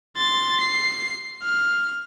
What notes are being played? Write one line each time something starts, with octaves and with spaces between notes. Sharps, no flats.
C6 A6
C7
F6